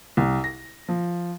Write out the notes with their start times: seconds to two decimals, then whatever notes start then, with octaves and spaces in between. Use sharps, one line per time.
0.17 C2
0.44 A#6
0.89 F3